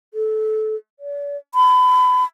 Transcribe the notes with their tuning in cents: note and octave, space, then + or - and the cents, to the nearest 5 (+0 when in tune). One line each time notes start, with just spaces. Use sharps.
A4 -20
D5 -45
B5 +30